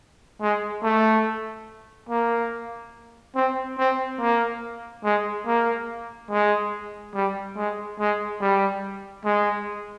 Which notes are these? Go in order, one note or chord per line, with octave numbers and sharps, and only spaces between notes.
G#3
A3
A#3
C4
C4
A#3
G#3
A#3
G#3
G3
G#3
G#3
G3
G#3